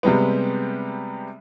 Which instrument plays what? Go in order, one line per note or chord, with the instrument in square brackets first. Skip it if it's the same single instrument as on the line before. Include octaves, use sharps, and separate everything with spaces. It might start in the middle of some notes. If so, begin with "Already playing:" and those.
[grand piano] C3 G3 G#3 B3